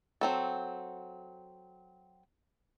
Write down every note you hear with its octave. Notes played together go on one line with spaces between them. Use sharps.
F#3 C4 A4